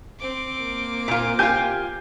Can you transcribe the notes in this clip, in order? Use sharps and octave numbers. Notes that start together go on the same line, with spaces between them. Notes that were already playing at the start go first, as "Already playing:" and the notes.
C4 D6
A#3
A#2 F4
F4 G4 G#5 G6